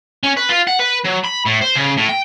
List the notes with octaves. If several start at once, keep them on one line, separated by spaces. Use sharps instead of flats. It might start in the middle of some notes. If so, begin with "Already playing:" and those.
C#4
B4
F4
F#5
B4
F#3
B5
A2
C5
C#3
A2
G5